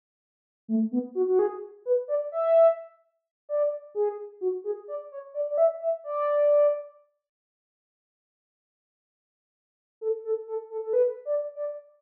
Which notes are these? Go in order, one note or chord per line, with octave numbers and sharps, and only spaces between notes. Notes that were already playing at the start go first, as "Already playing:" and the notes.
A3
B3
F#4
F#4
G#4
B4
D5
E5
D5
G#4
F#4
G#4
D5
C#5
D5
D5
E5
E5
D5
A4
A4
A4
A4
A4
B4
D5
D5